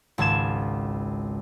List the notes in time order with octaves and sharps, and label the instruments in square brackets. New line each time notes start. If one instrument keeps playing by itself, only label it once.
[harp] G#1 C#2 A5 G#6 E7